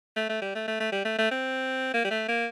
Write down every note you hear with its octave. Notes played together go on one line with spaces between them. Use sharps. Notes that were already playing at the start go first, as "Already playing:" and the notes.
A3
A3
G3
A3
A3
A3
G3
A3
A3
C4
A#3
G3
A3
A#3